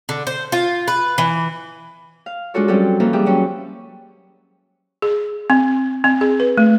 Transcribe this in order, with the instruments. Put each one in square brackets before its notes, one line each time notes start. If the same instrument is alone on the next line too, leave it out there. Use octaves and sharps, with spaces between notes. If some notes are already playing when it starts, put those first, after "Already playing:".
[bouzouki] D3
C5
F4
B4
E3
[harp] F5
G#3 D4 F4 F#4 A4 C#5
F#3 G3 C4 C#4 A4
E3 F3 A#3 A4
G3 G4 G#4 E5
E3 F#3 C#4
[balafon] G#4
C4
C4
G#4
B4
A3